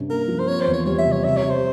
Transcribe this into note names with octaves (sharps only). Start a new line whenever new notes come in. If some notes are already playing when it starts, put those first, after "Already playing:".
Already playing: G2 C3 C#4
A#3 A#4
F3
C5
C4 C#5
C5
E2
C#5
G3 C#5
E5
C3
C#5
C3 E5
C#5
C3
C5